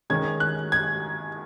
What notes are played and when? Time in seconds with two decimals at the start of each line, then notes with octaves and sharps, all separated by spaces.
0.10 D#3 G#3 C#4 G#6
0.40 F#6
0.72 G#6